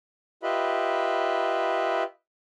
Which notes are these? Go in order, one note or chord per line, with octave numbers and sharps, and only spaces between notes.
F4 G4 B4 D#5 E5 B5